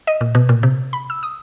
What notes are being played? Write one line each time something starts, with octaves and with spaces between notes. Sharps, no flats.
D#5
A#2
B2
A#2
C3
B5
E6
D#6